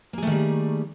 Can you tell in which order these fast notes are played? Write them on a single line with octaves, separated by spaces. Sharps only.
A#3 G#4 A3 D#3 G3